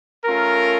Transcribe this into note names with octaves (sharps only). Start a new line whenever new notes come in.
A3 C#4 F4 A#4